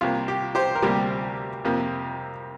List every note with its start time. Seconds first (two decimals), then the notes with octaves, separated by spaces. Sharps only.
0.01 C2 C3 A#3 F4
0.28 G4
0.55 G4 C5
0.75 A#4
0.82 D2 C3 G3 A#3 G4
1.65 F2 C3 A#3